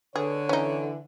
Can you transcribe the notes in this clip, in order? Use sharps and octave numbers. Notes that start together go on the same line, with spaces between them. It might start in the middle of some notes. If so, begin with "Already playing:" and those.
D3 G#4 B4 C#5
E3 C#4 D#4